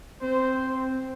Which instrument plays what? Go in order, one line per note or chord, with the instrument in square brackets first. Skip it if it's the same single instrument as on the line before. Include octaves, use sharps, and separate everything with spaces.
[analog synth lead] C4 [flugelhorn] C5